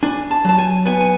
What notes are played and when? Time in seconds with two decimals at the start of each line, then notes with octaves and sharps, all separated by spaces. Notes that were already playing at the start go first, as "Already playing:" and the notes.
0.03 D4 G#5
0.31 A5
0.45 F#3 A5
0.58 G#5
0.86 B3 G#5
1.01 G#5